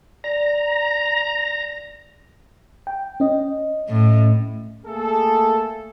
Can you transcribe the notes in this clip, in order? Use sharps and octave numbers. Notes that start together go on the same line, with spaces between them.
D5 A#5
G5
C#4 D#5
A2
A3 A#3 G#4 A4